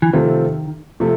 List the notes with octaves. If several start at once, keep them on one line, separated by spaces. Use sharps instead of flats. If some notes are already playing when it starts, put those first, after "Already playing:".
E3
C3 D#3 F3 A3 C4 F4
C3 F3 A3